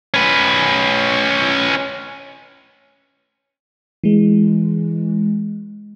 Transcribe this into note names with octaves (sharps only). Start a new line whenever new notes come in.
C#4 B4
E3 G#3